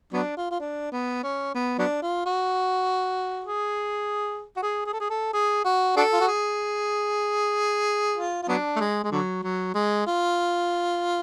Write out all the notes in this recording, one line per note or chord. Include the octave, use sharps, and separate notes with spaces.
F#3 B3 D4
F4
F4
D4
B3
C#4
B3
F#3 B3 D4
F4
F#4
G#4
F#4
G#4
G#4
A4
G#4
A4
G#4
F#4
D4 F#4 A4
F4
F#4
G#4
F4
F4
F#3 B3 D4
A3
G#3
G#3
D3 F#3
F#3
G#3
F4